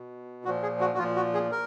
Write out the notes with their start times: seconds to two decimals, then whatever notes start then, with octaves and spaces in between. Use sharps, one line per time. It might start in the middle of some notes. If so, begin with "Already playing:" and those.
Already playing: B2
0.45 A#2 F#4
0.48 F3
0.63 G#4
0.80 F#4
0.94 F#4
0.98 A#2 F3 F4
1.16 F#4
1.34 G#4
1.51 A#4